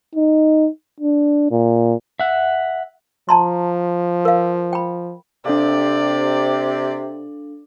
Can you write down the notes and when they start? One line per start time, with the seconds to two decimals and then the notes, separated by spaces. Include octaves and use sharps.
0.15 D#4
1.00 D4
1.51 A#2
2.20 E5 F#5
3.29 F3 A5 A#5 C6
4.25 A#4 F5
4.73 G5 B5
5.46 C3 D4 A4 D5 F5